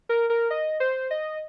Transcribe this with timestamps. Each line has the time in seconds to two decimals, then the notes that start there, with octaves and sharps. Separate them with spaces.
0.09 A#4
0.30 A#4
0.50 D#5
0.80 C5
1.11 D#5